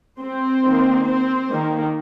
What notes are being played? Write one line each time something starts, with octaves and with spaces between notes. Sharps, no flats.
C4 C5
D#3 A#3
C4 C5
D#3 A#3